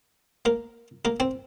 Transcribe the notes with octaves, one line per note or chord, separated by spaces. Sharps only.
A#3 A#4
A#3 A#4
C4 C5